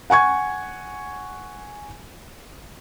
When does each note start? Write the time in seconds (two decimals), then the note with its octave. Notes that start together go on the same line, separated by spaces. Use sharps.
0.10 F#5 G#5 C#6 G#6